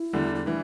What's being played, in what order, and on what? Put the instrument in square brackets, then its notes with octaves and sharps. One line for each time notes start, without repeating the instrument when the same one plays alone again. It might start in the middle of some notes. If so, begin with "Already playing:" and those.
Already playing: [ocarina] E4
[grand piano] E2 D3 G3
[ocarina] E4
[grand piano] E3 G3 [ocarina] D4